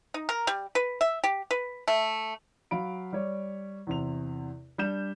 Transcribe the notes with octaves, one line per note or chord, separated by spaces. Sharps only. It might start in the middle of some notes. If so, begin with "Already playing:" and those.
D#4
A#4
G3
B4
E5
G4
B4
A3
F#3 F5 B5 D7
G3 C#5 D5
E2 C3 F7
G3 D4 G6 E7